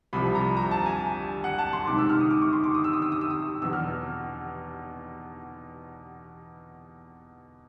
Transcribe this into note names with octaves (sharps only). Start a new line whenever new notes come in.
C2 C3 F3 B5
A#5
A#5
A5
G#5
F#5
A5
C6
C#2 C3 D#3 D6
E6
F6
D#6
D6
C#6
C6
D6
D#6
E6
D#6
E6
D#6
E6
D#6
E2 B2 E6
F6